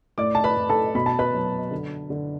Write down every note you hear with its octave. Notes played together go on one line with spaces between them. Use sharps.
A2 D5 D6
A5
B4 B5
A2
A4 A5
B2 B5
A5
B4 B5
F#3
D3
D3